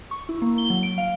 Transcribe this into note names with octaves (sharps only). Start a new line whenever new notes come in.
C#6
E4
A#3
G7
F#3
D7
F5